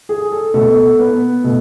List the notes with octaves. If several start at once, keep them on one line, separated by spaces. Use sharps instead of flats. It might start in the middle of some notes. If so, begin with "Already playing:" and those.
G#4
A4
B2 A3 A4
B3
B2 A3